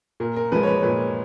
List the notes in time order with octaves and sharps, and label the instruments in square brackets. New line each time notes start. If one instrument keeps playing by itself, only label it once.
[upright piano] A#2 A#4
A#4
F3 G#3 B4
C#5
B4
A#2 B4